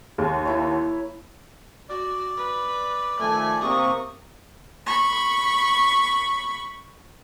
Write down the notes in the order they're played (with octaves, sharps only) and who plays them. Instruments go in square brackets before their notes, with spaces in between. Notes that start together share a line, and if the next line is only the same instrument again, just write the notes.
[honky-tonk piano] D#2
[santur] A#3 E4 C#5
[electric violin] F#4 [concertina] D5
[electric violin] B4
[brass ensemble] D#3 F3 A3 [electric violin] G#5
[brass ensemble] C3 A#3 [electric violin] C#6 D#6
[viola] B5 C#6